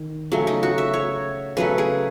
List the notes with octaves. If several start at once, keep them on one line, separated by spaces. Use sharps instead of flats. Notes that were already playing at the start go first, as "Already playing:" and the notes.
Already playing: D#3
C#3 F#3 A3
D#4
F#4
E5
C#5
C#3 F#3 A3 B4
G#4